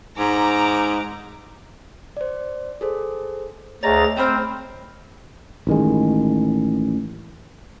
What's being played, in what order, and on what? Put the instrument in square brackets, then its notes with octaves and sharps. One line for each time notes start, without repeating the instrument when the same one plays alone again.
[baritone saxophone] G#2 [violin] A#5 D6
[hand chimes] C5 D5
G#4 A4 C5
[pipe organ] D2 A#5 A6 [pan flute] G#4 [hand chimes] C#5 D#5
[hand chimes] A3 B5 F6 [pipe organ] C4 [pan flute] C5
[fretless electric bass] A1 D#3 G#3